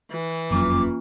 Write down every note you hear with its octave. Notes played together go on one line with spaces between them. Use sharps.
E3
F#1 F2 F#3 A#3 C#4 F4 D6